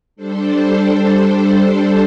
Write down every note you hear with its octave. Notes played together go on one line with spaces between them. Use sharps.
G3 D4 A4 C5